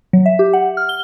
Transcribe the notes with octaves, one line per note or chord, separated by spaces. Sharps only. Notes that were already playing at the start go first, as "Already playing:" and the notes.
F#3
E5
G4
F#5
F6
G7